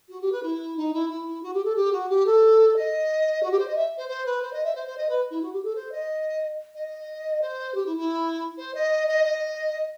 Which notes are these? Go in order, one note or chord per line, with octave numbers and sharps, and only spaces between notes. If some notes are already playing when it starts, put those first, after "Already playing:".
F#4
G4
B4
E4
D#4
E4
E4
F#4
G4
A4
G4
F#4
G4
A4
D#5
F#4
G4
C5
D#5
E5
C5
C5
B4
C5
D#5
E5
C5
C5
D#5
B4
E4
F#4
G4
A4
C5
D#5
D#5
C5
G4
E4
E4
C5
D#5
D#5
D#5